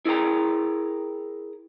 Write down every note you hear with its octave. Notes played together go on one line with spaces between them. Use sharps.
E4 G#4 A#4 G5 A#5